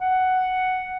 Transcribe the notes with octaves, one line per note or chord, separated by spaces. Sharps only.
F#5